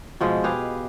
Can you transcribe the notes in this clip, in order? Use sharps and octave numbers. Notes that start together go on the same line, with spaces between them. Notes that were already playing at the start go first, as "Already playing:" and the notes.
B2 F3 G#3
G4 G#4 B4 F5